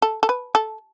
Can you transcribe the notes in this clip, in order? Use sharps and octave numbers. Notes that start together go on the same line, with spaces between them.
A4
A4
B4
A4